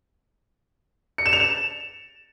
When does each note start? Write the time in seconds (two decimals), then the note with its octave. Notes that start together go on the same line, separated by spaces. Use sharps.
1.18 C#7
1.26 E7
1.33 F7
1.40 E7